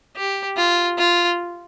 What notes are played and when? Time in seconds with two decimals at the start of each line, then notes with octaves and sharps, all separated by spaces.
0.16 G4
0.57 F4
0.98 F4